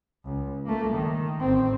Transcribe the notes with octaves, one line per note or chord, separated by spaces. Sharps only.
C#2
A3 A#3
D#3
A1 C4